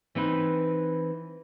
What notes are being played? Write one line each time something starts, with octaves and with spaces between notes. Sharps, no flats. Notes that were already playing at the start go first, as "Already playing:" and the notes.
E3 C4 D#4 B4